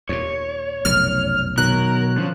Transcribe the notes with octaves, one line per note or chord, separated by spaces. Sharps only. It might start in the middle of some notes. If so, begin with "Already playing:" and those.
D#2 A#2 C#5
F1 B1 F#2 F6
B2 D#3 F#3 A#4 F#6
D3 F3 C#4